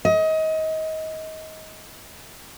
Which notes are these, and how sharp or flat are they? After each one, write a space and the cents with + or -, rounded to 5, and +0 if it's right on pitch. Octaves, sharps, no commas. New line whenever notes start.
D#5 +25